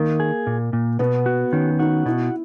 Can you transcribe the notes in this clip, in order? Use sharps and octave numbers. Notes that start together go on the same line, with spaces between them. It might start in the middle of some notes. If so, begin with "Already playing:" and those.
Already playing: D#3 A#3
G#4
A#2
A#2
B2 B3
F#4
D#3 C#4
D#4 F#4
B2 E4